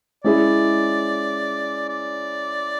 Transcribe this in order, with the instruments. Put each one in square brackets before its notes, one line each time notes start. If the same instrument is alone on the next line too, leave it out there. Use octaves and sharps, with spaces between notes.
[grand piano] G#3 C#4 E4 G#4 C#5 [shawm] D5
[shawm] D5